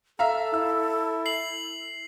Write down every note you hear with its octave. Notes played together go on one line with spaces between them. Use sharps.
A4 E5 F5 A#5
E4 E6
C7 F#7